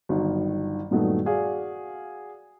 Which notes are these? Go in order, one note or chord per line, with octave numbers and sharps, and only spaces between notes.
G1 D#3 F#3
G2 A#2 D#3 F#3 A3 B3
F#4 G#4 D5 F5